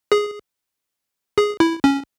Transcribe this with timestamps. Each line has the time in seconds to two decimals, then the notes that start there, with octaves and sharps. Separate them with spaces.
0.12 G#4
1.38 G#4
1.60 E4
1.84 C#4